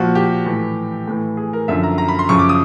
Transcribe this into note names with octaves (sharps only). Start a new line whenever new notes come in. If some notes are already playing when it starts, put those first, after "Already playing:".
Already playing: A#2 F3 F#4
G4
A2 E3
A2 E3
G#4
A#4
F#2 D3 F3 E5
A#5
A#5
B5
C6
F#2 C#3 F3 C#6
D6
D#6